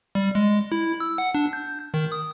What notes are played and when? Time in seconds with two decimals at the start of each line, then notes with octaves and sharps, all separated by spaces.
0.15 G3
0.35 G#3
0.72 E4
1.00 E6
1.18 F#5
1.35 D4
1.53 G6
1.94 D#3
2.12 D#6